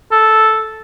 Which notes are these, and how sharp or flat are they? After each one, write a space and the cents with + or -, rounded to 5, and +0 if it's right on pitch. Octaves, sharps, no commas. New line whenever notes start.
A4 -5